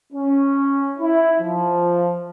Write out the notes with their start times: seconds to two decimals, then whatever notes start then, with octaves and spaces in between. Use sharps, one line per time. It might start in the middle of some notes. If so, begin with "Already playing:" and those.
0.13 C#4
0.99 E4
1.41 F3